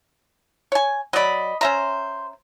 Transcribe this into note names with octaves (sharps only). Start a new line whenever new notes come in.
C#5 G#5
F#3 D5 D#5 B5
C#4 C5 E5 A#5